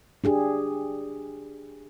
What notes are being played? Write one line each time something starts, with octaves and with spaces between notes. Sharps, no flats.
D4 G4 G#4